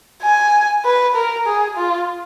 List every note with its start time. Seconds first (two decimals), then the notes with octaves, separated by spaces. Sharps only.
0.23 G#5
0.85 B4
1.15 A#4
1.46 G#4
1.77 F4